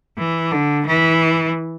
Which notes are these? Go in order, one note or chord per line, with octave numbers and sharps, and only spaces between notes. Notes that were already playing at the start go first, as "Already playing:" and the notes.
E3
D3
E3